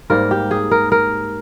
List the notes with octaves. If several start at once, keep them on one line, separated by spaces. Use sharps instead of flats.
G#2 G3 A#3 A#4
G4
G#4
A#4
A#4